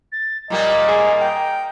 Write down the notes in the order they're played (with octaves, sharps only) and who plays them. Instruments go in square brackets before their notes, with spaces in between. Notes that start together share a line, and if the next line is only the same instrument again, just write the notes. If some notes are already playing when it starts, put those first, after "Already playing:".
[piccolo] A6
[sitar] A#2 G3 A#3 [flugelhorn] D#5 [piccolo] A#5
[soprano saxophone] G#4
G5